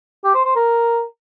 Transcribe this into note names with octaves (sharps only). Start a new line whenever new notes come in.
G4
C5
C5
A#4